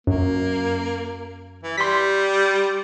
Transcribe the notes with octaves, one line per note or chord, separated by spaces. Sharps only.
F#2 A#3
E3
G3 C6 B6